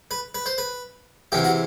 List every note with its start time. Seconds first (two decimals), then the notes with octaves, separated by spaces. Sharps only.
0.11 B4
0.35 B4
0.46 C5
0.58 B4
1.32 E2 C3 E3 G4
1.44 F#4